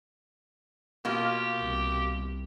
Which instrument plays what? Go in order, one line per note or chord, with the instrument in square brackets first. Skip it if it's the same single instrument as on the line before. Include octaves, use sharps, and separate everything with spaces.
[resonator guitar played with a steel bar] B2 A#3 F4 [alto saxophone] G4
[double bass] C2